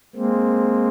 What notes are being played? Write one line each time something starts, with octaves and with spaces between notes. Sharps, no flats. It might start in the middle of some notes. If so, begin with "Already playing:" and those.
G#3 A#3 C4